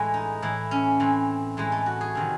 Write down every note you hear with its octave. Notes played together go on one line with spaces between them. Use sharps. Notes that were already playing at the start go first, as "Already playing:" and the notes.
Already playing: A2 E3 G#3
D#4
A2 E3 E4
C#4
A2 E3 C4
A2 E3 G#3
A3
F#4
G#4
C3 D#3 F#3